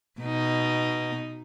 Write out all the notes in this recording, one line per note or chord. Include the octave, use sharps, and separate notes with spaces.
B2 D#4